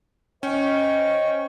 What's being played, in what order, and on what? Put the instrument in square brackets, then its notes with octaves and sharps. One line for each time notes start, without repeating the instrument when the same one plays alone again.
[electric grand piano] C#4 [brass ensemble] C5 D#5 [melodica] G5 C#6